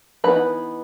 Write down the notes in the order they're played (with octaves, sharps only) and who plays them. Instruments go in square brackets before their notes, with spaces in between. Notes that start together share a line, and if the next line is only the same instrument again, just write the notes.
[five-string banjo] E3 B3 D#4 B4 B5